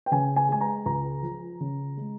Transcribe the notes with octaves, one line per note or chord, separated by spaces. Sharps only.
G5
C#3 G#5
G#5
G#3 G#5
A#5
C#2 A#5
F3
C#3
G#3